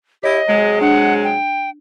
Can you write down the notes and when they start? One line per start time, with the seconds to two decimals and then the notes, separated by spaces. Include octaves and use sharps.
0.23 E4 G4 C#5 D#5
0.48 C3 F#3 G#3
0.81 D4 F#5
1.24 G5